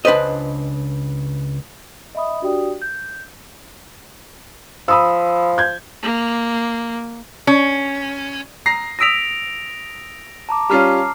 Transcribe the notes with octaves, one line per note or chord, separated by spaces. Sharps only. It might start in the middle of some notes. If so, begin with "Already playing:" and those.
C#2 D4 B4 C5 D#5
D#5 E5 B5 D#6
D4 F#4 G4 D5 G5 D#6
G6
F3 B5 D#6 E6
G6 G#6
A#3
C#4
A#5 A#6 C7
D#6 E6 A#6 B6 D7 F7
A5 A#5 D6
G3 C#4 F4 A#5 F6 C7